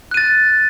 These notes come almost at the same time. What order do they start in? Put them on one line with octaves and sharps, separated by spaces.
F#6 D#7 A6